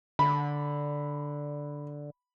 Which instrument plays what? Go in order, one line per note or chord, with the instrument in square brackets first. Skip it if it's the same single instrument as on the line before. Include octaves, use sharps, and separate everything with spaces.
[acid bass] D3 [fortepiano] B5